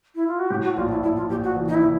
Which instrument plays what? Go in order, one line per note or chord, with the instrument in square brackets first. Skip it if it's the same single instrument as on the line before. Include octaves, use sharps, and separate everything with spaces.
[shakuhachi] E4
F4
F#4
[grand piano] A2 [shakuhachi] G4
[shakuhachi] F#4
[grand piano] A#1 [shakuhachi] F4
[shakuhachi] E4
[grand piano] A#1 [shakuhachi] E4
[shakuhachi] F4
[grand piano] A#1 [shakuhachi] G4
[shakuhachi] F#4
[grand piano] E3
[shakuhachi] D#4
E4
[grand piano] E3